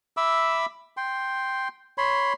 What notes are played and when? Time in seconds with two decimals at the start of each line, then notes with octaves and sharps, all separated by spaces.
0.17 E5 B5 D6 E6
0.97 G5 C6
1.98 C#5 B5 C6